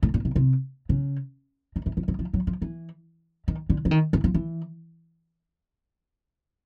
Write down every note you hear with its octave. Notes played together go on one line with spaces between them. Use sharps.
A2
A#2
B2
C3
C#3
D#3
E3
F3
F#3
F3
F#3
F3
E3
D#3
D3
E3
D#3
E3
F3
E3